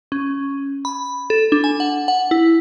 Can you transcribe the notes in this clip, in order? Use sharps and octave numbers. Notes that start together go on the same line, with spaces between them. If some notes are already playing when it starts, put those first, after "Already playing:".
C#4
B5
A4
D4
G#5
F#5
F#5
E4